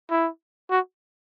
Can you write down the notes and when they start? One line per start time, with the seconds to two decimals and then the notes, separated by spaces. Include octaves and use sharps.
0.10 E4
0.71 F#4